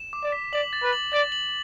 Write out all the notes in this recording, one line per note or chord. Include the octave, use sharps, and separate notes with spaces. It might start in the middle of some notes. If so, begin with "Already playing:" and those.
Already playing: E7
D6
D5
B6
D5 F#7
A6
B4
F#7
D5 A6
F#7